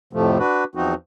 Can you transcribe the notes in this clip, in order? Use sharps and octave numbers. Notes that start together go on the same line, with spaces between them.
F2 A2 C3 F3 A3
D4 F#4 B4
E2 F3 C4 D#4 F#4